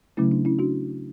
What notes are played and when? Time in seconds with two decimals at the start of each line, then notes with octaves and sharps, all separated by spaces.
0.17 C#3 F#3 A3 C#4 E4
0.32 D4
0.45 C#4 E4
0.59 D4 F#4